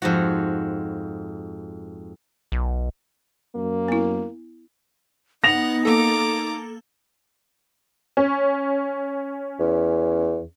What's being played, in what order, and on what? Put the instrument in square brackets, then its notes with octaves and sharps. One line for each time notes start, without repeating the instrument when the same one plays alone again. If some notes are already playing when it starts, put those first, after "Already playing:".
[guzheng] F2 G#2 F#4
[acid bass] B1
[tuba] F#2 [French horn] A#3
[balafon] B3 E4
[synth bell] B3 [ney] D#4 [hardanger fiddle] F#5 [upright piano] A#6 F7
[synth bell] A#3 A4 [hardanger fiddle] A#5 D6
[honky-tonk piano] C#4
[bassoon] E2